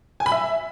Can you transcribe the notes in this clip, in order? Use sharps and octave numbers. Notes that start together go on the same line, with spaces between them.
G#5
B5
E5